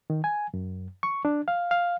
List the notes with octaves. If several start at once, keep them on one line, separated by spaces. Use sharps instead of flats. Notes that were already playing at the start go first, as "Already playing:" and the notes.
D#3
G#5
F#2
C#6
D4
F5
F5